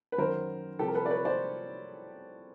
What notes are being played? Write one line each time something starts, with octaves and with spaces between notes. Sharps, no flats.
B4
F#2 D#3 F#3 A#4 C5
C2 C3 F3 G4 A4
A#4
A4 B4
D5
B4 C#5
C5 D5